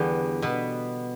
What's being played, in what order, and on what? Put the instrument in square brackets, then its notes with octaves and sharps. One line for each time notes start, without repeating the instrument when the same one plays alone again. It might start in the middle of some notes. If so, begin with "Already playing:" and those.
Already playing: [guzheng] E2 D3 G3 B3 G4
B2 B3